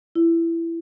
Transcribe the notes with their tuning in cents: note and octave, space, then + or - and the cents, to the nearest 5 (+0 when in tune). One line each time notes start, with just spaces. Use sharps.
E4 +15